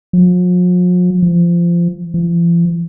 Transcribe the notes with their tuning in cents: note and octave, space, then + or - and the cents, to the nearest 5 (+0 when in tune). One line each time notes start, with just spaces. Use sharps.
F3 +45
F3 -20
F3 -45